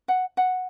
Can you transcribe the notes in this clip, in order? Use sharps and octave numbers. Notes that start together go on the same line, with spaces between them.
F#5
F#5